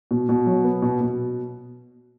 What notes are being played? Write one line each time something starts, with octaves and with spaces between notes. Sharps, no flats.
B2
B2
F#3
B3
B2
B2